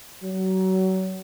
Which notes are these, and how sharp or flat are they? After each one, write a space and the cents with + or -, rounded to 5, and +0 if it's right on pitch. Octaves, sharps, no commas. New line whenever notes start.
F#3 +30